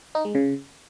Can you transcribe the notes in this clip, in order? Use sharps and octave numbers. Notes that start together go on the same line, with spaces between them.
D#4
G#3
C#3